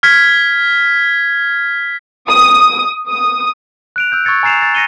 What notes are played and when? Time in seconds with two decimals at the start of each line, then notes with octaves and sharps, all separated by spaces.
0.03 F6 G#6 B6
2.29 D#6
3.08 D#6
3.96 F#6 D7 F7
4.12 E6 F#6 G6
4.25 C#6 E6 G#6 A6 C#7
4.43 G#5 A#5 A6 C7 E7 F7
4.62 A6
4.75 A#6 C#7 D#7 G7